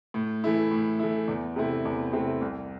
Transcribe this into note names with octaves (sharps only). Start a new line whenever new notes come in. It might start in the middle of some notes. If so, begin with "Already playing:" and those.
A2
E3 A3 E4
A2
E3 A3 E4
E2
C3 A3 C4 E4
E2
C3 A3 C4 E4
C2